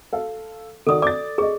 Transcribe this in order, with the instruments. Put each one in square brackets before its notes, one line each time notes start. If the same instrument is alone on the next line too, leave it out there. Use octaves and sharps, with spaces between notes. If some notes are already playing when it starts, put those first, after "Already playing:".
[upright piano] A4 F5
[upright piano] D#3 F#4 D5 [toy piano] A4 D#6
[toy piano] D5 [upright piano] D6 A6
[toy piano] G#4 [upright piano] D#5 C#6